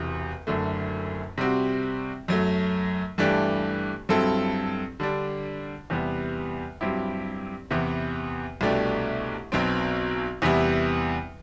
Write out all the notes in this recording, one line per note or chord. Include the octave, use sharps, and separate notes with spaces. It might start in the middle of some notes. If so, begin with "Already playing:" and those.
Already playing: E1 E2 C3
F#1 F#2 D3 A3
C3 G3 C4 F#4
F#2 F#3 A3
G2 E3 A3 D4 G4
G2 F#3 C4 E4 A4
D3 G3 D4
E2 C3 G3 B3
G2 F#3 C4 E4 G4
E2 C3 E3 B3
C2 B2 A3 D4 G4
B1 B2 F#3 C4
E2 C3 G3 B3 E4